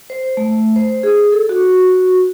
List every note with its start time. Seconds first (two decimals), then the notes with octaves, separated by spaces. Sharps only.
0.10 C5
0.37 A3
0.76 C5
1.03 G#4
1.32 A4
1.49 F#4